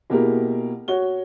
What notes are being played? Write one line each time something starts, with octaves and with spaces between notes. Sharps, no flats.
B2 A#3 E4 G4 G#4 A#4
F#4 C#5 G7